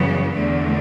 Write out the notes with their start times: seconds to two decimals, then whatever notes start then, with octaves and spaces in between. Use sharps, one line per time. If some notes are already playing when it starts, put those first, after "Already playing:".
Already playing: F#2 C#3 E3 G3 B3
0.34 E2 D3 A3